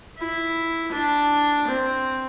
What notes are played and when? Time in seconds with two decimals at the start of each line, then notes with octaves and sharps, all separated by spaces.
0.18 E4
0.92 D4
1.67 C4